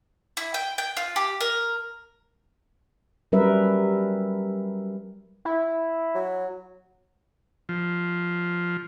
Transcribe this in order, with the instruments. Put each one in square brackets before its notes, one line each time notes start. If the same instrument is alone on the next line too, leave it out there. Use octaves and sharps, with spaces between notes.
[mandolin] E4
G5
G5
F4
G4
A#4
[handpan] F#3 G3 C#4 A#4 B4 E5
[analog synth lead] E4
[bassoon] F#3
[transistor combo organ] F3